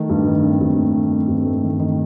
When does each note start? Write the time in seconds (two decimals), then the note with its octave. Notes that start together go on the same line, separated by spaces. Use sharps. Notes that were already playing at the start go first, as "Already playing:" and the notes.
Already playing: D#3 A3
0.10 G2
0.27 D#3
0.44 C4
0.61 G2
0.78 A3
0.95 D#3
1.12 C4
1.28 G2
1.45 A3
1.63 D#3
1.80 D#3